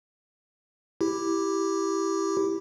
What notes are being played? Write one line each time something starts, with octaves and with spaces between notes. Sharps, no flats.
E4 G4